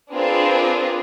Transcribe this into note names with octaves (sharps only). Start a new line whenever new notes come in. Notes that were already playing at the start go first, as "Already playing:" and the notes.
C4 D4 F4 G#4 A#4 B4